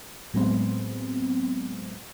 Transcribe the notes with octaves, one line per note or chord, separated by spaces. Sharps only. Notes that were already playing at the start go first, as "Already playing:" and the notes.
A2 F#3 G#3 B3 C4